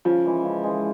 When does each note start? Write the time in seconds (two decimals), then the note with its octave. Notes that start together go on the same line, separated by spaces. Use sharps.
0.05 C#3 F3
0.25 E3 G#3
0.45 C#3
0.64 E3 G#3